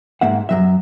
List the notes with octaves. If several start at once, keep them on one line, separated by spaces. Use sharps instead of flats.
G#2 A#3 E5 F#5
F#2 F#3 E5